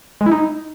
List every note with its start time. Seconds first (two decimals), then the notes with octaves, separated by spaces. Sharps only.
0.21 G#3
0.26 E4
0.32 D#4